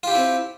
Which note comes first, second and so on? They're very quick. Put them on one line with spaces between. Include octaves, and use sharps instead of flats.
F4 G4 E4 C4